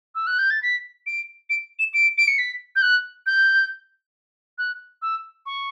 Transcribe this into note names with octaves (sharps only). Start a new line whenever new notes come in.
E6
F#6
G6
A6
B6
D7
D7
E7
D7
D7
C#7
B6
G6
F#6
G6
F#6
E6
C#6